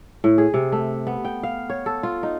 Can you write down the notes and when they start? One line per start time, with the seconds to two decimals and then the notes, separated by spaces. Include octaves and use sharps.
0.24 A2
0.38 G#4
0.54 C3
0.72 A3
1.07 B3
1.25 G5
1.43 F5
1.70 C#5
1.86 A4
2.03 F4
2.23 D#4